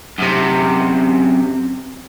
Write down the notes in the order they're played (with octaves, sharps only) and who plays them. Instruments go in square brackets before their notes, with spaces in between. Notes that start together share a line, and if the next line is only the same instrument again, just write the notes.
[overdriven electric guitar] F#2 C3